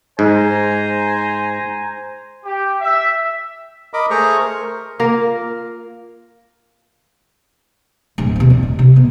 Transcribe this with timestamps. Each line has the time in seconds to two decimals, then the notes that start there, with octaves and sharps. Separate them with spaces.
0.19 G#2 C5 G#5 A#5
2.45 G4
2.81 E5
3.94 A#4 D#5 B5 D6
4.10 A3 G#4 C5 A#5 C#6
4.39 A#4
5.00 A#3 F4 A#4
8.18 D1
8.36 D#2 C3
8.50 E2
8.63 D#3
8.79 C3
8.96 B3